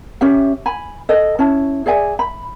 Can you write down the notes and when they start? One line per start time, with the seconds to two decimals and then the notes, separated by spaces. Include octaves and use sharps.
0.21 C#4 G4 E5
0.66 G#5 B5
1.09 A4 D#5
1.39 C#4 E4 A5
1.86 G#4 D5 E5 G#5
2.19 B5